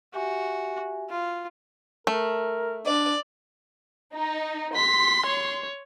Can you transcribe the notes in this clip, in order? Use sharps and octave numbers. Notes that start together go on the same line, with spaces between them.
F#4 G4 E5 G#5
F4
A3 A#4
D4 D5
D#4
C6 B6
C#5